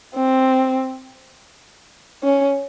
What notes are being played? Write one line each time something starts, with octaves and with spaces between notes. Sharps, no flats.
C4
C#4